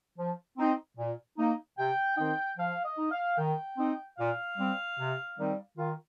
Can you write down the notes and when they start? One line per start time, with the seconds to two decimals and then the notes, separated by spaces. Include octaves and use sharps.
0.17 F3
0.58 C4 D#4
0.97 A#2
1.37 A#3 D#4
1.77 C3 G5
2.17 D#3 C4 D#4 G5
2.58 F3 F5
2.84 D#5
2.98 D#4
3.11 F5
3.37 D#3 G5
3.77 C4 D#4
4.17 A#2 F5
4.57 G3 C4
4.98 C3
5.37 D#3 G3 C4 D#4
5.77 D#3 F4